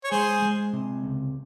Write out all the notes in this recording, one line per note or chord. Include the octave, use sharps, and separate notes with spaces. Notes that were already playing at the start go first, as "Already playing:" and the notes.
C#5
G#3 G#4 C5
G#3
C3
C#2